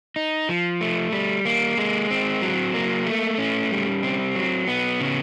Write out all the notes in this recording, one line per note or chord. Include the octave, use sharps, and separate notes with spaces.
D#4
F3
A3
G3
A#3
G#3
C4
F#3
A#3
A3
C#4
G3
C4
F#3
B3
C#3